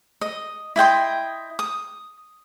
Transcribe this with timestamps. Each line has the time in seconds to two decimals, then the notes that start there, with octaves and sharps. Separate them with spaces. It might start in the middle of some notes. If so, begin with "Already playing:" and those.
0.21 D#5
0.76 E4 D#5 G5 C6
1.59 D#6